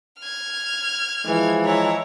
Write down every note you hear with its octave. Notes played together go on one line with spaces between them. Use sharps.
F6 G#6
E3 F3 G#3
E4 C#5 A#5